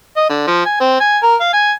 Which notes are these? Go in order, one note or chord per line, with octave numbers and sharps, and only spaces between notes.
D#5
D3
F3
G#5
C4
G#5
A#4
F5
G#5